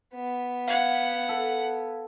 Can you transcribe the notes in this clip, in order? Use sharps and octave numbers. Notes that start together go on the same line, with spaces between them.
B3
F5 F#5 G#6
A4